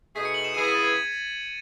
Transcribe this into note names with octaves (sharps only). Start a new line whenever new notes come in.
B2 A3 D#4 G#4 B6
C#7
F#7
E7
C#3 E3 B3 E4 G#4 D#7
B6
A6
G#6
B6